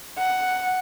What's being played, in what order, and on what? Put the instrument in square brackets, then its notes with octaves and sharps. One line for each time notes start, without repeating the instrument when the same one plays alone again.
[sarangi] F#5